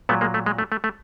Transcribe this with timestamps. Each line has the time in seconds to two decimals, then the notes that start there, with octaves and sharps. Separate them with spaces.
0.09 A#2 F#3 A3 B3
0.21 G#3 A#3
0.34 A3
0.46 G#3
0.58 A3
0.72 A3
0.84 A3